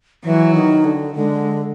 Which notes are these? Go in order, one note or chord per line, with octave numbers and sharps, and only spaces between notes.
E3 F#3
D#3
D3
D3 G#3